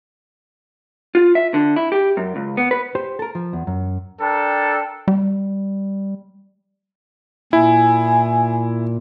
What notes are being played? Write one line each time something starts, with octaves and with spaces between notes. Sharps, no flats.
F4
E5
D3
E4
G4
F#2
C#2
B3
B4
G4 C5
A4 A#4
F3
E2
F#2
D4 A4 A#4 G5
G3
A#2 E4 G#5